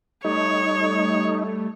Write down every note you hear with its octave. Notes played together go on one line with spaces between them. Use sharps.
G3 A3 D#4 C#5